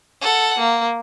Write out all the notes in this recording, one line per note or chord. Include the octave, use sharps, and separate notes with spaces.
A4 F#5
A#3